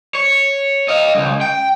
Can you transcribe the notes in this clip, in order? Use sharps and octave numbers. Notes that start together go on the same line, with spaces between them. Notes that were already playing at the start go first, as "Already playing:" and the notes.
C#5
D#5 F5
C#2 F#2
G5